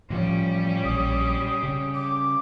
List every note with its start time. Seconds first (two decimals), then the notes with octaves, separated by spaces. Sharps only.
0.10 A2 E3 F3 G3 C#4 G4
0.85 A#1 D#6
1.63 C#3
1.95 D6